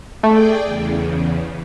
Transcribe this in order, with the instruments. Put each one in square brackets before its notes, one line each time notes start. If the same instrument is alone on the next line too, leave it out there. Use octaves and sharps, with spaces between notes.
[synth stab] A3 [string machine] G#4 D5 G5
[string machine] E2 C#3